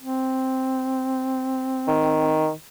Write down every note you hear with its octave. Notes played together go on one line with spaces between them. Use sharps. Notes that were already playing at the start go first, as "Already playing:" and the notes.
C4
D#3